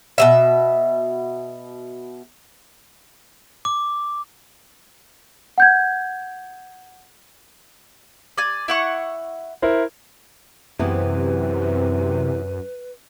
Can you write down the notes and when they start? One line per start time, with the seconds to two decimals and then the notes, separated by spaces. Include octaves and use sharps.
0.18 B2 G3 E5
3.65 D6
5.58 F#5 G6 G#6
8.37 D5 G#5
8.68 E4 F#5 C#6
9.62 E4 A#4 C5
10.79 F#2 C3 E3 B3 G#4 B4